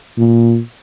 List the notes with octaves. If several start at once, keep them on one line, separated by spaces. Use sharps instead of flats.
A#2